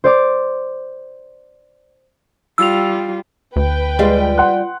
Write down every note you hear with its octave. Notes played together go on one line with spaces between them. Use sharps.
C5 D5 D6
G3 F4 E6 F7
D2 B4 G5
G3 G#3 F4
F#5 C6 F#6